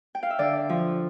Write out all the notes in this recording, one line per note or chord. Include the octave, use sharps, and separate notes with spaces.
G5
F5
E5
D3 D5
F3